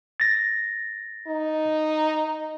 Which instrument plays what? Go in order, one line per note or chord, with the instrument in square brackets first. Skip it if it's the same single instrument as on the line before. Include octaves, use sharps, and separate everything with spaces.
[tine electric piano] A6 A#6
[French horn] D#4